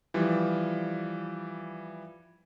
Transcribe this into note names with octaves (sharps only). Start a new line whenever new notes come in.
E3 F3 G3